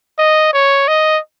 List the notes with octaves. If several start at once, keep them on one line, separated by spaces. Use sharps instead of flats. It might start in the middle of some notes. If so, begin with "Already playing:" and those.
D#5
C#5
D#5